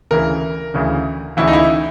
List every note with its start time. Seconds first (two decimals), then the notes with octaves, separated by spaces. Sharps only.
0.11 D2 C#3 E3 A#4
0.74 D2 C#3 E3
1.37 D2 C#3 E3 E4
1.47 D#4
1.53 E4